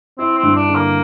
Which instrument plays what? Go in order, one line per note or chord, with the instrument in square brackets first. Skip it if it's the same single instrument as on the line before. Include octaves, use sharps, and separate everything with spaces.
[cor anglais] C4 [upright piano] E4
[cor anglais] C4
[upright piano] G2
[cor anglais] D4
[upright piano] D3
[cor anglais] A#3